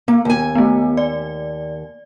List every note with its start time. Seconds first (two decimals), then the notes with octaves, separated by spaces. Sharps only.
0.08 A#3 B3
0.25 D#2 G#5
0.55 A3 B3
0.97 D5